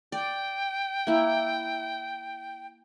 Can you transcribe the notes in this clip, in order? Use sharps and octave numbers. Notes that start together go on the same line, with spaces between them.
D5 G5
A#3 E4